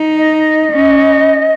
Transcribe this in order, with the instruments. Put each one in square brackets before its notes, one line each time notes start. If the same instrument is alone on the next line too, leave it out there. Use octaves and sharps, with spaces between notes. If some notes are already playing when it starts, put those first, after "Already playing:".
Already playing: [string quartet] D#4
[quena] D#5
[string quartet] C#4